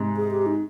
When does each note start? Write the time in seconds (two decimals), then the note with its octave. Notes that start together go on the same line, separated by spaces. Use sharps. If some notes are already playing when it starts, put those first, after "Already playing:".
Already playing: G#2 C3
0.17 G#4
0.31 G4
0.46 D#4